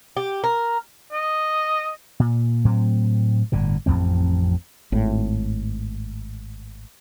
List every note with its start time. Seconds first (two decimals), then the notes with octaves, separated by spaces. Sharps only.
0.17 G4
0.44 A#4
1.12 D#5
2.20 A#2
2.65 A2 F#3 C4
3.52 G1 A2 D3
3.86 A1 F2 A2 C4
4.92 G#1 A2